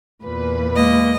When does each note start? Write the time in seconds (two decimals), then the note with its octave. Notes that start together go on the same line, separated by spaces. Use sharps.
0.23 E2 A#2 B4
0.75 G#3 A#3 D#5